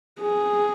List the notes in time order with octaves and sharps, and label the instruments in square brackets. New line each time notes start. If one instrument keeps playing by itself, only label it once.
[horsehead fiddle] G#4